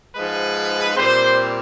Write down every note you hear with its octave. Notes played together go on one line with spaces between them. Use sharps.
G#2 F3 G#3 B4
A#2 G3 C4 C5